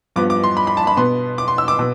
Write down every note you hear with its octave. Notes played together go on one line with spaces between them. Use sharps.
G2 F3 B3 D6
D6
C6
B5
B5
A5
B5
B2 B3 C6
D6
C6
E6
D6
B2